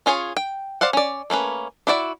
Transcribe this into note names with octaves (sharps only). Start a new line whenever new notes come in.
C#4 F4 G#4 C#5
G5
C5 D5 F5 F#5
C#4 D5
A3 A#3 C#4 B4
D4 E4 F#4 D5 E5